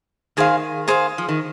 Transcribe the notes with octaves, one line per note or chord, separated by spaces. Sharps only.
D#3 G#4 C5 F5
G#4 C5 F5
F3
D#3